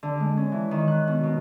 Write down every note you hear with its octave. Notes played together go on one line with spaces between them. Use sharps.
D3
G#3
C#4
E3
D#3
F#6
B2
B2